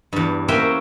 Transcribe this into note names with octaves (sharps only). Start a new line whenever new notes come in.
E2 G2
A#3 C#4 F#4 C5 E5 G5